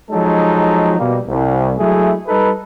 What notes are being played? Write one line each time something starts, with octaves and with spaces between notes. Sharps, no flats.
F3 F#3 G#3 D#4 A4
B2 G3 A#3
C2
F#3 G#3 A3 E4 G#4
G3 D#4 A4 B4